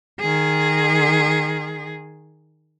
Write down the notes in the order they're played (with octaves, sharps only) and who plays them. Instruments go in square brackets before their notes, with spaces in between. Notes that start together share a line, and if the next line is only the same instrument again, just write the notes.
[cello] D#3 G#4